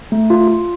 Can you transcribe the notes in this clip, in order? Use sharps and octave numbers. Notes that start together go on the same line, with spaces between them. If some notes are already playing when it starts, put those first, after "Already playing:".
A3
F4
F4